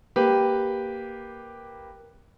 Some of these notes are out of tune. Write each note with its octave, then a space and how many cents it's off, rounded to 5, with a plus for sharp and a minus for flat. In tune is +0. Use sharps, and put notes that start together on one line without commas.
A#3 +0 G4 +0 B4 +0